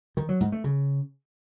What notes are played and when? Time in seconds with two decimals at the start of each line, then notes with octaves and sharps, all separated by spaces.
0.17 D#3
0.29 F#3
0.40 G#2
0.52 A3
0.64 C#3